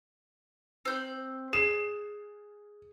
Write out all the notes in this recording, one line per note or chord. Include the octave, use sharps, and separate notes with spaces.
C4 G6
G#4 E7